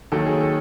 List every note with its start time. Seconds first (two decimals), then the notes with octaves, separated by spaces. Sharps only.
0.12 D#2 D#3 F#3 A4
0.26 G#4
0.40 A4